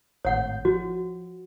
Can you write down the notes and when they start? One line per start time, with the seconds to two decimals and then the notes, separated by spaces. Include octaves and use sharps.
0.25 G#1 A2 C#5 F#5 G6
0.65 F3 F#4